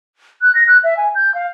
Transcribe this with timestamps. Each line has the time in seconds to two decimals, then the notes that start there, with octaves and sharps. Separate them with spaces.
0.42 F#6
0.55 A#6
0.67 F#6
0.84 E5
0.97 G#5
1.15 G6
1.35 F5